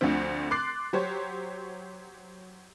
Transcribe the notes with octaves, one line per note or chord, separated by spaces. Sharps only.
D2 D3 F3 A3 C4
C6 D6 F#6 A6 C7
F#3 G4 C5 C#5